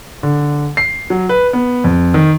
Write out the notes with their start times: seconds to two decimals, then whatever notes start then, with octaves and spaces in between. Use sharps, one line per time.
0.23 D3
0.77 C7
1.10 F#3
1.29 B4
1.53 B3
1.84 F2
2.14 D#3